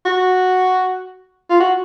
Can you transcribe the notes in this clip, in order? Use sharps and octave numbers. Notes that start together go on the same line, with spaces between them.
F#4
F4
F#4